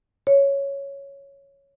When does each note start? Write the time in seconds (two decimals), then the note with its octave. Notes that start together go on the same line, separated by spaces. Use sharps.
0.27 C#5